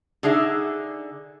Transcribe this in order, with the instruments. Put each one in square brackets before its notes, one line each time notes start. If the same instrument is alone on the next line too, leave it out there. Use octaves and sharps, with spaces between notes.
[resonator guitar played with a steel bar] D3 D#4 G#4 D5 E5